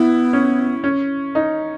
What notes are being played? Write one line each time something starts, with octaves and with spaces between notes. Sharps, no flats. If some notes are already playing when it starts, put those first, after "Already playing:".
Already playing: B3 E4
C#4
C#4
D#4